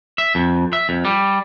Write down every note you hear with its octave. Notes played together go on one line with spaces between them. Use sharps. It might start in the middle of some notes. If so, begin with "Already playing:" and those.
E5
F2
E5
F2
G3